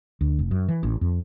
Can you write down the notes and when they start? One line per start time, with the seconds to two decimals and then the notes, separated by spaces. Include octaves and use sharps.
0.21 D2
0.39 F1
0.51 F#2
0.68 E3
0.83 A1
1.01 F2